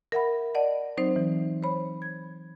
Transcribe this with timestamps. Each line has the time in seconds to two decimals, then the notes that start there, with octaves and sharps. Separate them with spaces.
0.12 A#4 E5 F#5 B5
0.54 D5 D#5 F#5 A5
0.97 F#3 C4 D#4 C5
1.16 E3
1.63 C5 C#5 B5
2.02 G#6